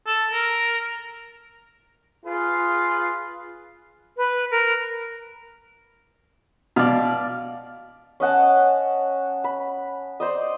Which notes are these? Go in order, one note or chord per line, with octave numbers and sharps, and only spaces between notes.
A4
A#4
F4 G#4 B4
B4
A#4
B2 D5 F5
C#4 D#5 F#5 A5
B5
C5 D5 D#5